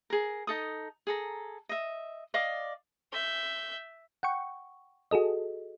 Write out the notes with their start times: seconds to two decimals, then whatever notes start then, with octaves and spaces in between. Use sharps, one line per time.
0.10 G#4 A#4
0.47 D#4 A4 D#6
1.07 G#4 A4 A#5
1.69 D#5 E5
2.34 D5 D#5 F5 D6
3.12 E5 G6
4.23 F#5 G5 C#6
5.11 F#4 G#4 A4 D#5